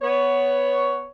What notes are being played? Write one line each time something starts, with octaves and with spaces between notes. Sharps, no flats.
B3 C#5